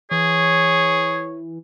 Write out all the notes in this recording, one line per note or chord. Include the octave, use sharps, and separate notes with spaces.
E3 G#4 C#5